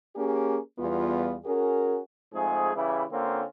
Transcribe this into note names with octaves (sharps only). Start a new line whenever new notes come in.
A#3 C#4 G4 G#4
E2 G3 B3 F4
C#4 F#4 G#4 A#4
F2 G#2 A3 G#4
C#3 E3 G3 E4
D3 A#3 C4 C#4 F4